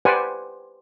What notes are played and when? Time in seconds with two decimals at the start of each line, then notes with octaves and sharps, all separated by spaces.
0.05 G4 B4 C5 D5 F#5 G#5